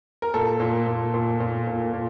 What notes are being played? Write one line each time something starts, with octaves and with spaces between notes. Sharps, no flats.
A#4
A#2 A4
A#2
A#2
A#2
A#2
A#2
A#2